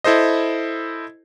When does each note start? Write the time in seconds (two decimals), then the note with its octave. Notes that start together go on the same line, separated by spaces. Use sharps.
0.04 E4 A4 C5 D#5